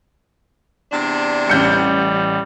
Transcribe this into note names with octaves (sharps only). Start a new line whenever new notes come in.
E2 C3 D4
A1 G3 G6 C#7